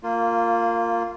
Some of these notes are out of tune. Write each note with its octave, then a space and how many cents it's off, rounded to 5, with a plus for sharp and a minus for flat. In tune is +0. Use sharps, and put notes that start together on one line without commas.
A#3 -20 F4 +0